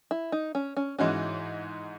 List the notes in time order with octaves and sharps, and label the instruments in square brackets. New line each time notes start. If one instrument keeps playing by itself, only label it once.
[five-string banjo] E4
D#4
C#4
C#4
[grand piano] G#2 E3 G#3 D#4 F#4 [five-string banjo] C#4